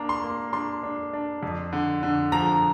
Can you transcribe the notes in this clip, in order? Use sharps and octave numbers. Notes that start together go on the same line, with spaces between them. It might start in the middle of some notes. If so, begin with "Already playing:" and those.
Already playing: A#3 D4 A#5
C6
A#3
D4 C6
D4
D4
F2
D3
D3
F3 A#5